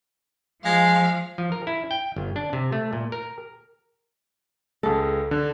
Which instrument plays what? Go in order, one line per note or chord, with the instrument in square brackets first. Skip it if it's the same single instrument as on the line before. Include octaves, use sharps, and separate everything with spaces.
[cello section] F3 [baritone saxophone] G#3 [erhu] F5
[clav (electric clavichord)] F3
A#4
E4
G5
G1
D4
C3
A3
A#2
A#4
[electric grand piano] C#2 G#3 [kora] A4
[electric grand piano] D3